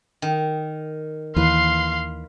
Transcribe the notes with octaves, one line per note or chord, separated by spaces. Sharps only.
D#3
D#2 E3 B4 F5 C6